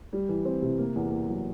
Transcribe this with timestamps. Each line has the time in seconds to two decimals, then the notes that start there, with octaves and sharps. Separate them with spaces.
0.13 G3
0.29 E3
0.45 C4
0.62 C3
0.79 A#3
0.95 E2
1.12 A#3
1.29 F#3